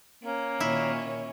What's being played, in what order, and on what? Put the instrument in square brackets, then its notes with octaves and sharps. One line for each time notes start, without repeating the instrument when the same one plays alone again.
[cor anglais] A#3 [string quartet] C#4
[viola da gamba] A#2 D#3 C#5 [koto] E4